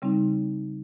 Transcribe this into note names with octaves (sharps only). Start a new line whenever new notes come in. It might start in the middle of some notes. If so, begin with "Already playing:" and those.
C#3 G3 C4 D#4